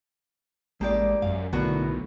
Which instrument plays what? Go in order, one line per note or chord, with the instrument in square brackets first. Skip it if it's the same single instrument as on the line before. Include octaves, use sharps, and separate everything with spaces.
[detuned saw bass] A1 [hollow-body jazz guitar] G#3 [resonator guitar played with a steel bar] A#3 G4 D5
[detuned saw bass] F#2 [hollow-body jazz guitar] F5
[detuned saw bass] B1 [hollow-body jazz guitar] A2 D3 [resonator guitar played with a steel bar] B3 F#4 A#4